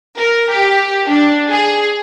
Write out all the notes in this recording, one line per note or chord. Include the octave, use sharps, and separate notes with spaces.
A#4
G4
D4
G#4